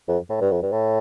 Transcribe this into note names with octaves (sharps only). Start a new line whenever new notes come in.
F2
A2
G2
F2
G2
A2